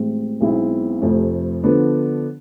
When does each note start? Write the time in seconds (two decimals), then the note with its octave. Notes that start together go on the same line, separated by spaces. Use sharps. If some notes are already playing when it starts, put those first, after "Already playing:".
Already playing: A1 A2 G#3 C4
0.41 B1 B2 G#3 C4 E4
1.02 F1 F2 C3 F3 A3
1.63 D3 F3 B3 D4